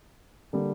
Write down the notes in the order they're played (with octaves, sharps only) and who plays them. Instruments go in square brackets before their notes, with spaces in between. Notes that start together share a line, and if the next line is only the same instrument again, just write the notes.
[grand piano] D3 G3 A#3